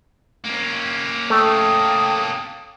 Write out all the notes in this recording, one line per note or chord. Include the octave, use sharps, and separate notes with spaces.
A#3 C#4
A3 G5 A5 D#6